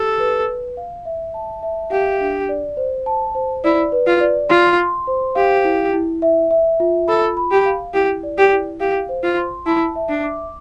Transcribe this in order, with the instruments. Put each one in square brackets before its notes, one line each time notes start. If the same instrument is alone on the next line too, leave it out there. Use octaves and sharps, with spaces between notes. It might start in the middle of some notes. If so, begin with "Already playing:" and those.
Already playing: [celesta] G4 [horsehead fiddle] A4
[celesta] B4
B4
F5
E5
A5
E5
[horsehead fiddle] G4 [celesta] F5
[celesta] D4
D5
C5
A5
C5
[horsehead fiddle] E4 [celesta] D5
[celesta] B4
[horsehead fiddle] F4
[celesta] D5
[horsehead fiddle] F4 [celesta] C6
[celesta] C6
C5
[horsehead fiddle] G4 [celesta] F5
[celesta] E4
E4
E5
E5
F4
[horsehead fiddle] A4 [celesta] B5
[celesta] B5
[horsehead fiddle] G4
[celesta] F5
[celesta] E4 [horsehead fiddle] G4
[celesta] D5
[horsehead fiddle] G4
[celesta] E4
[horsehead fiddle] G4 [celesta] F5
[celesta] C5
[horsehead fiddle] F4
[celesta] C6
[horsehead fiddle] E4 [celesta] A5
[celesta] E5
[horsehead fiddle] D4
[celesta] D6